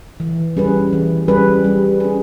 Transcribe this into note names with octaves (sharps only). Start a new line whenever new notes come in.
E3
G3 C#4 G#4 B4
E3
G3 C#4 G#4 B4
G3
C#4 G#4